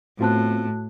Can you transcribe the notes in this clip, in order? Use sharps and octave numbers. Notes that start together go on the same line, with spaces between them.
A2 B3 C4 F4 F#4 A5 F#6